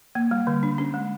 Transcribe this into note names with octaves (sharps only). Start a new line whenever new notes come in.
A#3
G3
D3
D4
C#4
G#3